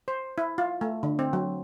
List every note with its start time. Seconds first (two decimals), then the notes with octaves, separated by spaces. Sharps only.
0.08 C5
0.38 E4
0.58 F4
0.81 A3
1.03 D3
1.19 C4
1.33 F#3